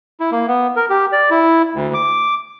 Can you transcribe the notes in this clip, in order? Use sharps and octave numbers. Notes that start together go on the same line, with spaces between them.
E4
A#3
B3
A#4
G4
D5
E4
D2
D6